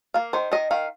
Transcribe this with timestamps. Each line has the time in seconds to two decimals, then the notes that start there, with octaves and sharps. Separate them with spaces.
0.14 A#3 F5
0.33 D#3 C5
0.52 D#3 D#5
0.71 D#3 F5